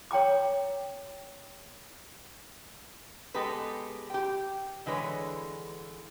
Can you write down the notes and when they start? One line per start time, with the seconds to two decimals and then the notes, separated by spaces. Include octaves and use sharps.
0.11 C#5 G5 A#5 D6
3.34 G#3 B3 G4 A4 B4
4.10 G4 G5
4.86 D3 E3 G#3 B4 C#5